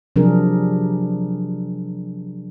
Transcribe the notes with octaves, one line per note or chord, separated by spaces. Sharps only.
C3 F3 F#3 D4 G#4 A#4